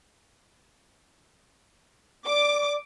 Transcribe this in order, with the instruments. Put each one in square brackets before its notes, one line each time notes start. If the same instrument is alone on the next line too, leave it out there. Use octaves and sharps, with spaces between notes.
[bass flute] D5 [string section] D6